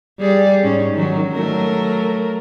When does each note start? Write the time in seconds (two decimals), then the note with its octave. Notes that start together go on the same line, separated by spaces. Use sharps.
0.19 G3 G#4 D5
0.63 G#2 C#4
0.94 D#3 F#3
1.32 F#3 A3 A#4